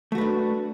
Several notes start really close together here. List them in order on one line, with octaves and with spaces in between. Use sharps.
A3 F#4 B4 D4